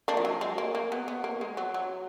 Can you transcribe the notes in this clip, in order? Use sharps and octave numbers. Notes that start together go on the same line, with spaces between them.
A#3 D4
F3
F#3
G#3
A#3
A#3
B3
B3
A#3
G#3
F#3
F#3